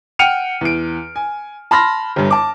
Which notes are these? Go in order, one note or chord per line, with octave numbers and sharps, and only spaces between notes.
F#5 G5 F6 C#7 D#7 F7
E2 D7
G#5
A5 B5 C6 F6 A#6
G1 G2
A5 D6